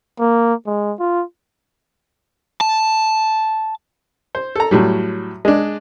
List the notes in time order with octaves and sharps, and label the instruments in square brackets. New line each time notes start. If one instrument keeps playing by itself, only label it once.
[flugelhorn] A#3
G#3
F4
[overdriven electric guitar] A5
[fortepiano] C5
A4 A#5
A2 F#3 G3
G#3 D4